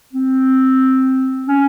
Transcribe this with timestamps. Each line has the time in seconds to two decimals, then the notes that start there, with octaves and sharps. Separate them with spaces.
0.13 C4
1.48 C#4